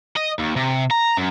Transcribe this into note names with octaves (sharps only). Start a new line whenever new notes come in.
D#5
D#2
C3
A#5
F#2